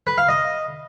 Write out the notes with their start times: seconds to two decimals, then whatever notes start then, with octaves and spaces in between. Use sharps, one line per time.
0.07 B4
0.18 F5
0.29 D#5